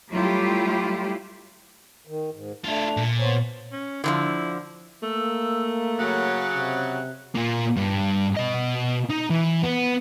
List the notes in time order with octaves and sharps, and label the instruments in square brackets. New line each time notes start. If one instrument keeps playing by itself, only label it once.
[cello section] F#3 G3 A3 E4 F4 G4
[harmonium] D#3
G#2
[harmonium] A3 D4 [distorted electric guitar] E4 F4
[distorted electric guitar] A#2
[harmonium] B3 C5 C#5
[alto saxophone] C#4
[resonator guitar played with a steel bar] D3 D#3 F3 [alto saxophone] E4
[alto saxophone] A3 [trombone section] A#3 [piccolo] E6
[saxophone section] C#3 F#3 [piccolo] F#6
[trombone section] C3
[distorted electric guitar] A#2 A#3
G2
B2 D#5
D#4
E3
B3